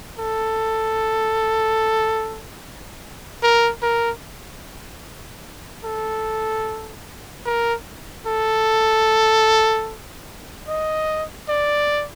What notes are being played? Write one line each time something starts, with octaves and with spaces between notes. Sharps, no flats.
A4
A#4
A#4
A4
A#4
A4
D#5
D5